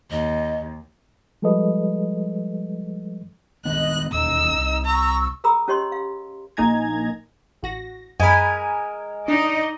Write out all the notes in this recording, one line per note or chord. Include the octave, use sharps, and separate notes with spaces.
D#2 D#5
F3 G3 G#3 A4 B4 D#5
D#3 G#3 B3 D#5 F#6
E1 D#2 C#4 D#4 D#5 E6
C2
A#5 C#6 E6
G#4 A#4 A#5 B5 D#6 E6
C#4 G4 C#5 D#5 C6
F5
A#1 A#3 D#4 G#5 A#5 G#6
A1 F#4 A#6
F#2 G#3 A#4 G#5 B5
D4 D#4 D5 D#5